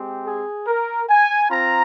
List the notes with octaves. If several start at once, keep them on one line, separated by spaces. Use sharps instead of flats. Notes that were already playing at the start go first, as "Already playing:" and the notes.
Already playing: G#3 C4 G4
G#4
A#4
G#5
C4 F4 A#5